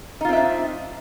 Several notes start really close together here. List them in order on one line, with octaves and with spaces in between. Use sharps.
D#4 F4 C4 E5 D4